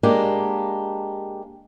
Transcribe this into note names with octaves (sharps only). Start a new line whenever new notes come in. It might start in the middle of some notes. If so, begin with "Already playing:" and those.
G#3 A#3 D4 G4